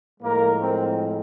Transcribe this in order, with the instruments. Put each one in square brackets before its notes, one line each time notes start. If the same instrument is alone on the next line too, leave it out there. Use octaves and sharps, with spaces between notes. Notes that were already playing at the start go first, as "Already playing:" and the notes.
[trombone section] A2 F3 G#3 A#3 A#4
C4 C5